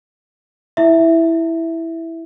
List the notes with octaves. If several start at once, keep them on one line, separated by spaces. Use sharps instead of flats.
E4 E5